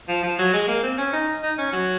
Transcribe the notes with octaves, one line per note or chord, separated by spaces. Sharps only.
F3
F3
F#3
G#3
A#3
C4
C#4
D#4
D#4
C#4
F#3